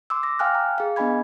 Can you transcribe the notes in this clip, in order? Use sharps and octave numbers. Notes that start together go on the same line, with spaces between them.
C6 D6 E6
D6 A#6
F5 G5 G#5 F6 F#6
A#5
G#4 F5
B3 D4 D#5 G#5 B5 G#6